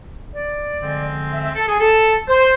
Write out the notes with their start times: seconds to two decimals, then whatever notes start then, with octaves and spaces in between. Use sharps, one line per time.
0.32 D5
0.81 D3 F3 G#3 C4
1.31 E5
1.42 E5
1.56 A4
1.68 G#4
1.79 A4
2.28 C5